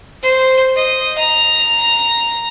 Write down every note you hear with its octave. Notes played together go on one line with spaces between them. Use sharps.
C5
D#5
A#5